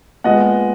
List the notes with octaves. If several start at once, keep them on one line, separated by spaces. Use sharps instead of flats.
A#2 G#3 B3 D#5 F#5